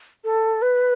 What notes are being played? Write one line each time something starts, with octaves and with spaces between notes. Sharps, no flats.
A4
B4